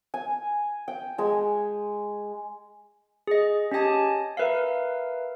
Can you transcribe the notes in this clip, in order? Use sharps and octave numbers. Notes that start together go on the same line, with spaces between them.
G#5
G5
G#3 G#5
G#4 D#5
C#4 G4 D#5 G#5 A5
A#4 B4 E5 F5